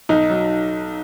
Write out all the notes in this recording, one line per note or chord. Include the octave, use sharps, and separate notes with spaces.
B1 D#4
F#3